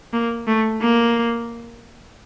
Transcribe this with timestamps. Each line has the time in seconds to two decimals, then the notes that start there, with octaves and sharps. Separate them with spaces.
0.13 A#3
0.48 A3
0.82 A#3